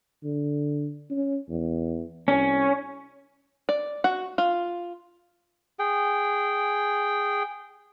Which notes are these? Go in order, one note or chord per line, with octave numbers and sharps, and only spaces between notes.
D3
C#4
E2
C2 C#4
D5
F#4
F4
G#4 G5